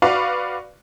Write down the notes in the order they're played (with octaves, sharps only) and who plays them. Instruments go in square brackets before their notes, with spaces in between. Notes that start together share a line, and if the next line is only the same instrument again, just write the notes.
[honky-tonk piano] F#4 B4 D5 F5 C#6